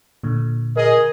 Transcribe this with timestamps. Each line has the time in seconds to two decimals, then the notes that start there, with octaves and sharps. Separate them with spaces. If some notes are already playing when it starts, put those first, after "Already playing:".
0.23 A#2 D3
0.76 G#4 A#4 D#5